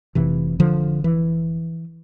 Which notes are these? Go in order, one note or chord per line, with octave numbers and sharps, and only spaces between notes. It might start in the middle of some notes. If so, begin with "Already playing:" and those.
F1 F2 C3 E3
D3 F3
E3